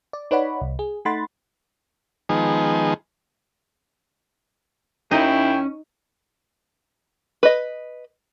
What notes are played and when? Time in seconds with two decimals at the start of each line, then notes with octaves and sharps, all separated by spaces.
0.13 D5
0.31 D#4 B4 C#5 D5 F#5 B5
0.61 C2
0.79 G#4
1.05 A3 D#4 F#5 B5 C6 A6
2.29 D#3 F3 G#3 B3 D#4 G#4
5.11 D#2 C#4 D#4 E4 G5
7.43 B4 D#5